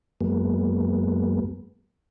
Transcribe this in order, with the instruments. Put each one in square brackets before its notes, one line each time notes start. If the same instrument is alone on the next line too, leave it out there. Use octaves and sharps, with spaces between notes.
[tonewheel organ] F#2 F#3 G#3 A#3 B3